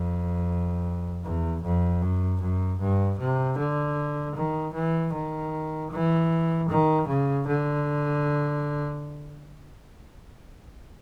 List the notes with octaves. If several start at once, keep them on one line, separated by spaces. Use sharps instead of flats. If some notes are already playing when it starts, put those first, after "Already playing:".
Already playing: F2
E2
F2
F#2
F#2
G2
C3
D3
D#3
E3
D#3
E3
D#3
C#3
D3